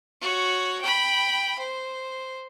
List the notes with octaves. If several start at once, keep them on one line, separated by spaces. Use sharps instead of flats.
F#4 C#5
G5 B5
C5